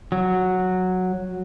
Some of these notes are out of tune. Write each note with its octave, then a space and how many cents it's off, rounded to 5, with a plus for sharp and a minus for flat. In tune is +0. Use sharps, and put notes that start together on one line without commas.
F#3 -5